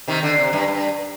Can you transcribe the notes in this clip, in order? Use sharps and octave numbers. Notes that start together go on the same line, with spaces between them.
C3 D#3
D3
C3
G2
G2